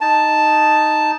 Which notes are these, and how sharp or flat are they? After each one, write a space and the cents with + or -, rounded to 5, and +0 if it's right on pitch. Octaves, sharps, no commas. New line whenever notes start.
D#4 +0 A5 +0